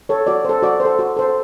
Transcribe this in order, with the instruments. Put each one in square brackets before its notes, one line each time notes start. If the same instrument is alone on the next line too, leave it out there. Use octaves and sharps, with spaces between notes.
[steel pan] A4 C#5
F#4 D5
A4 C5
F#4 D5
C5
A4
F#4
A4 C5